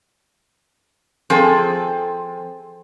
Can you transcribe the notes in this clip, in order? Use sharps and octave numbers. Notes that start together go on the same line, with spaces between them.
F3 C4 G#4 A4